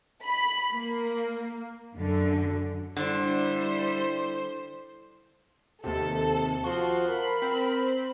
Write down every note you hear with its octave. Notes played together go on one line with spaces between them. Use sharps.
B5
A#3
F#2 D3
D3 G3 E4 C5
D#2 C3 A4
F3 F#4 C6
A#4 B5
C4